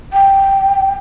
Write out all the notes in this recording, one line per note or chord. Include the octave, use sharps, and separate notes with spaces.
G5